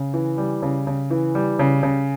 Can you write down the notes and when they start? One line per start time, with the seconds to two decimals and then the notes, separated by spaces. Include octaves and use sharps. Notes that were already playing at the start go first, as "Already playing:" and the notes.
Already playing: C#3
0.14 E3
0.38 G3
0.62 C#3
0.87 C#3
1.11 E3
1.35 G3
1.59 C#3
1.83 C#3